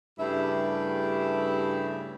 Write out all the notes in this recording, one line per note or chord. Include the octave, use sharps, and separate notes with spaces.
G2 C#3 A3 E4 G4 E5